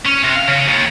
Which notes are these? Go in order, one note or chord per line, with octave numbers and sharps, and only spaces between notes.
C#4
C3
F5
C#3
D#2